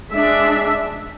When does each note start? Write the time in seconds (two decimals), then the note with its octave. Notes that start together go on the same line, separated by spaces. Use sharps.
0.11 G#3 D4 E5